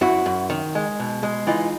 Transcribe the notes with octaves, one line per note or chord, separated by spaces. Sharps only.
F#2 E4 F#4
F#2
D#3
G#3
B2
G#3
E3 D#4 F4